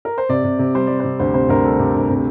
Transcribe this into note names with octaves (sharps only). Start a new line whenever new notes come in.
A#4
C5
C3 D5
C3
C3
G3 C5
G3 D5
C3 C5
D2 C5
C3 C5
D2 A#4
G3 A4
C3
D2
C3